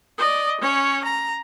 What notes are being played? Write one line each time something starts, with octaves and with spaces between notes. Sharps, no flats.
D5 D#5
C#4 C#5
A#5